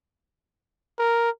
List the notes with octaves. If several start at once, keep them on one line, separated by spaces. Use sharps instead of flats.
A#4